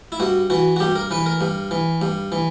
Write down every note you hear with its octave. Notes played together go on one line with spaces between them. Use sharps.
E4
G2 F#4
E3 F#4
F#4
G2 G4
A#4
E3 B4
A#4
G2
E3
G2
E3